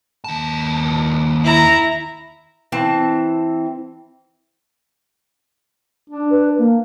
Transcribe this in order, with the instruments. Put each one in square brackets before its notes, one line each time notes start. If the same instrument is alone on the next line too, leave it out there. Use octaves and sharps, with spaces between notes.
[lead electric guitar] D#2 A5
[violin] E4 A#5
[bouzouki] E3 C4 A5
[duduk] D4
[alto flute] B4
A#3